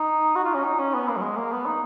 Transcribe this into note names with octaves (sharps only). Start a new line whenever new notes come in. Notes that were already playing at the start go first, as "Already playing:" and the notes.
Already playing: D#4
F#4
F4
C#4
D#4
C#4
B3
A#3
F#3
G#3
A#3
B3
D#4